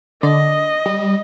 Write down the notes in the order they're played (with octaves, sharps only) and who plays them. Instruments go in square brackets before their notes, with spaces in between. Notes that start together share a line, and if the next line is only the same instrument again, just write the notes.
[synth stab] D3 D5 [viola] D#5
[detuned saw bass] G3